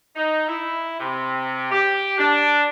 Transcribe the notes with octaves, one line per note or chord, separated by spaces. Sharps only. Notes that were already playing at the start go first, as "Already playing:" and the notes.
D#4
E4
C3
G4
D4